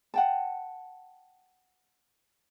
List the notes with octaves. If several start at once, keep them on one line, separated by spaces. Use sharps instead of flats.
F#5 G5 A5